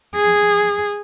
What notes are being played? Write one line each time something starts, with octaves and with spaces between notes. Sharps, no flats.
G#4